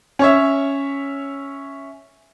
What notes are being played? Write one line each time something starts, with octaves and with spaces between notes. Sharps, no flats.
C#4 C#5 E5